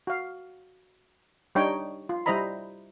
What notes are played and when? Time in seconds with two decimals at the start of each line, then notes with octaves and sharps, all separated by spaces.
0.07 F#4 F5
1.55 G3 D4 D#4 C#5 G5
2.09 F4
2.26 G3 E4 C5 D#5 A#5 B5